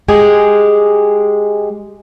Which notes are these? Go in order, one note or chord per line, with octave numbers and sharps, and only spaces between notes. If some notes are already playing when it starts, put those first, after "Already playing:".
G#3 G4 G#4